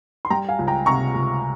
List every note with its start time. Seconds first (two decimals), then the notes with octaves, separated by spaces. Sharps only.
0.25 C6
0.30 G3 G5 A#5
0.48 F5 G#5
0.59 C#2
0.67 G5 A#5
0.86 C3 A#5 C#6
1.15 C#2